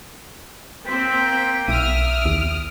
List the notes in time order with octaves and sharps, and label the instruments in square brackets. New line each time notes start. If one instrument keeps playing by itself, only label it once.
[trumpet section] A#3 G5 [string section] C4 [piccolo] B6
[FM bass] B1 [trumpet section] E5 [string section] D#6 F6 [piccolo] D7
[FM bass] D#2